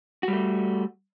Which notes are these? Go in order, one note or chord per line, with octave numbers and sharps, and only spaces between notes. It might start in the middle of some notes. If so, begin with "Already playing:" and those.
G3 A3 F#4